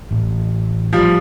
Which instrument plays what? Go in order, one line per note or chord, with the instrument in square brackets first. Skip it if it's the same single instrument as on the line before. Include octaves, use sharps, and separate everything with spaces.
[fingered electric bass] A1
[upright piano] F3 G3